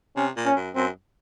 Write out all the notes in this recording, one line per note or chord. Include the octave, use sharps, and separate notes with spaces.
C3 C#4
A#2
C#4
F#2
F#2 C4